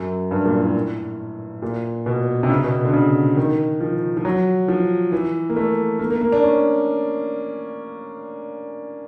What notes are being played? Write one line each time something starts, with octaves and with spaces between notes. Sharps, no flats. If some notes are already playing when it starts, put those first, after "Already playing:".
Already playing: F#2
G2
A#2
A2
A#2
B2
C3
C#3
B2
D3
C#3
D#3
F3
F3
F#3
F3
E3
A#3
A3
A#3
A#3
A#3
D4
C#4